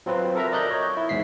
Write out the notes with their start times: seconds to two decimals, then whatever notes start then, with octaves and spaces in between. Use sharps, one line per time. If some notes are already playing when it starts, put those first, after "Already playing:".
0.06 F#3 C4 F4 B4
0.35 A4 A#4 E5 A#5
0.52 A#4 D5 D#5 F#6 G6
0.71 C#5
0.97 E4
1.09 E2 G#2 B6 C7